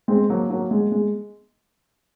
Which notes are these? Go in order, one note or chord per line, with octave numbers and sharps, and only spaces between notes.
G#3 C4
F#3 A#3
F#3 A#3
G#3
G#3